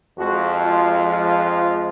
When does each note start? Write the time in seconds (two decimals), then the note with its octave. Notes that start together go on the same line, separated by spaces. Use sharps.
0.18 F2 F3 G#3 F#4
0.64 F4
1.10 F4